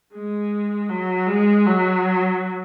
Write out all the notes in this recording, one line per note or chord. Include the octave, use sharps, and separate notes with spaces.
G#3
F#3
G#3
F#3